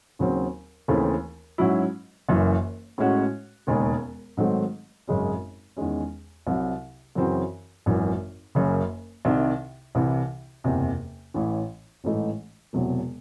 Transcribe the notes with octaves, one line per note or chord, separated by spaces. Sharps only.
D#2 C#3 F#3 C4
D#2 C#3 E3 A3 C4
G#2 F#3 C#4 E4
F#1 F#2 E3
A2 G#3 C#4 F#4
E1 D#2 C#3 G#3 C#4
G#2 D#3 F#3 A3 C4
G#1 F#2 C#3 G#3 C#4
E2 D#3 G#3 C#4
C2 C3 F#3
F#2 C#3 E3 C4 F#4
G#1 F#2 E3
F#1 F#2 C#3
C2 C3 D#3
C2 C3 E3
F#1 E2 C3
A1 A2 E3
A1 G#2 E3 A3 D#4
E1 E2 C3 F#3